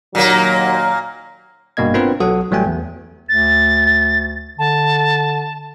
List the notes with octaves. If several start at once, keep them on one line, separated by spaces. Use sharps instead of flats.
D#2 A#2 F#3 A#3
G#1 G2 B2 A#3 D#5 G#6
B3 C4 D4 F4 A#4 B4
B1 F#3 F#4 A4 F#5 D#6
A1 F#3 G3 A3 G5 G#5
E2
D2 A6
D3 A5